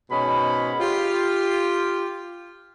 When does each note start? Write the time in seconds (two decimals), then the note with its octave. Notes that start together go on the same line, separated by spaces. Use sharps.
0.10 G#2 B2 G#3 C#4 B5
0.80 F4 G4